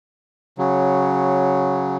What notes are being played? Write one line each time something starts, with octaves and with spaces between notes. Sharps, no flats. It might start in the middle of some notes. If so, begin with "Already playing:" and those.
C#3 F#3